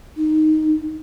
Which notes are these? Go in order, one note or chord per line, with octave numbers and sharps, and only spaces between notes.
D#4